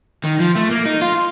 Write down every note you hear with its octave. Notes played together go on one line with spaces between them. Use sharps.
D#3
F3
A3
A#3
D#4
F4